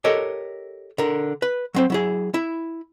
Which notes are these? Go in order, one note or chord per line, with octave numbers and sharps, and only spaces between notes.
G4 A4 A#4 C#5 D#5
D3 A#4
B4
F#3 C4 C5
F#3 E4 G#4
E4